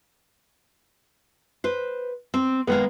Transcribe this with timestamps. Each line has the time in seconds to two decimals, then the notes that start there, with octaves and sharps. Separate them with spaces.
1.64 B4 C5
2.34 C4
2.67 D#3 G#3 A#3 B3